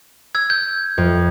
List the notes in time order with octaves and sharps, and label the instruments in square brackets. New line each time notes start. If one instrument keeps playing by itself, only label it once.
[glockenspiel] E6 G#6
G6
[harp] F2